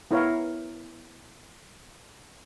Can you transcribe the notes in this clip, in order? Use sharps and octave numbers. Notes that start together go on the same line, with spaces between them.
B3 E4 A#4 C#5 F5